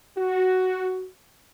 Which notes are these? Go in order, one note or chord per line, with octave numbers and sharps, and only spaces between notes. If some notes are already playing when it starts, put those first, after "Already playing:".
F#4